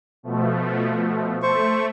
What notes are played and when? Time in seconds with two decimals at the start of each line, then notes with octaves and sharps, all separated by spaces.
0.23 B2 F3 A3
1.43 A3 C5 C#6